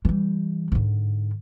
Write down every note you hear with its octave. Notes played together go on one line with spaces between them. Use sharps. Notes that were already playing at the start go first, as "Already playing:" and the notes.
E3 G3
G#2 D3